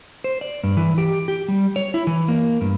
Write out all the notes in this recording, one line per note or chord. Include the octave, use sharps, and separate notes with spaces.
C5
D5
G2
E3
G4
G4
G3
C#5
E4
E3
A#3
G2